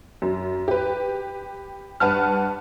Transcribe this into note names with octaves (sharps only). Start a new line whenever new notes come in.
F#2
G4 B4
G2 B4 F#5 A5 F6